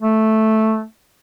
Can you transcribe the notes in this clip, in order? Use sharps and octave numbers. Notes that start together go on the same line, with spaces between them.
A3